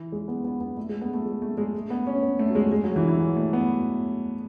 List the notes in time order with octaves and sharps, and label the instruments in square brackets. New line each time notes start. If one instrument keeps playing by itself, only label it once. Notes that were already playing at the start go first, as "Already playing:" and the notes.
Already playing: [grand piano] E3
G#3
B3
B3
B3
A3
G#3
B3
A3
G#3
A3
G#3
A3
B3
C#4
B3
A3
F#3
G#3
G#3
F#3
E3
E3
F#3
A3
B3